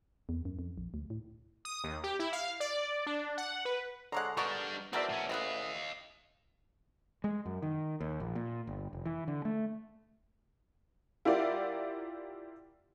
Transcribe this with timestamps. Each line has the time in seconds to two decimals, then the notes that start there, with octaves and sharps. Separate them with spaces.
0.29 E2
0.45 F#2
0.59 F2
0.78 A#1
0.94 D2
1.10 A2
1.65 D#6
1.84 D#2
2.04 G4
2.20 E4
2.33 F5
2.60 D5
3.06 D4
3.38 F#5
3.65 B4
4.12 D3 G#3 C5 C#5 F#5 A#5
4.37 G3 B3 D4 D#4 A#4 C#6
4.93 E2 D#3 C4 F#4 A4 A#4 D5 E5
5.10 A2 C#4
5.29 A1 C4 E4 G#4 D#5 F5 F#5
7.24 G#3
7.46 F#2
7.62 D#3
8.01 D#2
8.20 A#1
8.35 A#2
8.67 G1
8.93 F1
9.06 E3
9.28 D3
9.45 A3
11.25 E4 F4 G4 A#4 D5 F#5